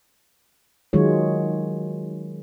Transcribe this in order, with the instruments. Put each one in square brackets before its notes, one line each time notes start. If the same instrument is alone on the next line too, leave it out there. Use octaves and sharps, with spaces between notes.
[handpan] D#3 F#3 G#3 F4 C#5